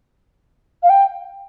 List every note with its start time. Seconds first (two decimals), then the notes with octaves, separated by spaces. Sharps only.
0.82 F5
0.89 G5